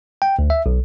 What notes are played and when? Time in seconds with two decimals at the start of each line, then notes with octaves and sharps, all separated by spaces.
0.22 G5
0.39 D2
0.50 E5
0.66 B1